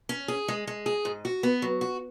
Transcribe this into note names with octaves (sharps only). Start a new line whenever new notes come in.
C#4
G#4
G#3
G#3
G#4
G#2
F#4
B3
F#3
F#4